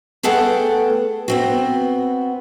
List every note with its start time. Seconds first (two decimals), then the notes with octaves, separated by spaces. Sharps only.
0.23 A3 B3 G#4 A4 F#5 G5
1.28 B3 C4 F#4